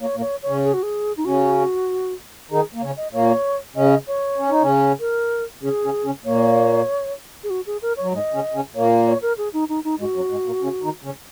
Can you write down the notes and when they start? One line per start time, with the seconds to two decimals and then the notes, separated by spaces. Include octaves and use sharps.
0.01 A#2 A#3 C#5
0.17 A#2 A#3
0.21 C#5
0.43 C#5
0.48 C#3 C#4
0.64 G#4
0.74 F#4
0.83 G#4
1.17 D#4
1.26 C#3 C#4 F#4
2.51 D#3 D#4 G#4
2.74 A#3
2.82 C#3 C#4 C#5
2.97 D#5
3.13 A#2 A#3 C#5
3.76 C#3 C#4 D#5
4.07 C#5
4.38 C#4
4.50 D#4
4.62 C#3 C#4
5.00 A#4
5.63 C#3 C#4 G#4
5.84 C#3 C#4
6.04 C#3 C#4
6.25 A#2 A#3 C#5
7.44 G#4
7.50 F#4
7.66 G#4
7.82 A#4
7.97 F#3 C#5
8.12 G#2 G#3 D#5
8.34 C#3 C#4
8.54 C#3 C#4
8.75 A#2 A#3 C#5
9.07 C#5
9.22 A#4
9.38 G#4
9.53 D#4
9.69 D#4
9.84 D#4
9.99 G#2 G#3 F#4
10.16 F#2 F#3
10.31 G#2 G#3
10.46 A#2 A#3
10.62 C#3 C#4
10.83 D#3 D#4
11.04 C#3 C#4